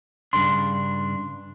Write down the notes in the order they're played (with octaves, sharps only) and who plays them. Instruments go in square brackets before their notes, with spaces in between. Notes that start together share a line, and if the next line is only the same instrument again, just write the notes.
[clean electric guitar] G2 C#3 D4 [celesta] C6